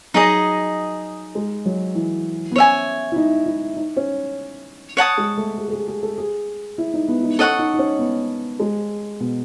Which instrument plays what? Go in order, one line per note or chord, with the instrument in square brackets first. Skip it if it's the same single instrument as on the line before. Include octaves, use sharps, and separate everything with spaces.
[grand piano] F#3 [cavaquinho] D#4 G#4 D#5
[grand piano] G#3
F#3
E3
B3
[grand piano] C#4 [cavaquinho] C#5 E5 G#5
[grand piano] E4
D#4
E4
D#4
C#4
[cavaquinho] C#5 F#5 A5 D#6
[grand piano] G#3
A3
G#4
A4
G#4
G#4
A4
G#4
E4
D#4
B3
D#4
[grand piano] C#4 [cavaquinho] A4 D#5 F#5 C#6
[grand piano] D#4
D#4
C#4
B3
G#3
B2